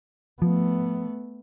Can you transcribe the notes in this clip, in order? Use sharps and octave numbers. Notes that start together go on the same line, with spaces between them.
F3 A3 B3